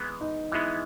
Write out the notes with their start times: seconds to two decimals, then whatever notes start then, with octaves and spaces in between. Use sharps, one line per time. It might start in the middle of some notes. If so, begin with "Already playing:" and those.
Already playing: E3 G#3 B3
0.21 D#4
0.52 E3 G#3 B3 E4